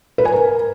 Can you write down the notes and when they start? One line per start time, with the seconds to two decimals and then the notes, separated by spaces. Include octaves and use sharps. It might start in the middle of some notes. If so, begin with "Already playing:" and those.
0.18 B4
0.25 G#5
0.32 A#4